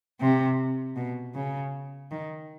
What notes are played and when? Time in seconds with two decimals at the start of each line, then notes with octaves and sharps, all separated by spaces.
0.20 C3
0.96 B2
1.35 C#3
2.11 D#3